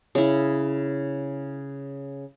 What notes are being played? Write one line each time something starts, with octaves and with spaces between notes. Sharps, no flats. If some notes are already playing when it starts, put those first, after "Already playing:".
C#3 E4